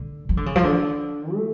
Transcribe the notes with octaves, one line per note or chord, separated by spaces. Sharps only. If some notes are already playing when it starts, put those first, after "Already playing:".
Already playing: D3
F3
D3
C#3
F3
D3
A3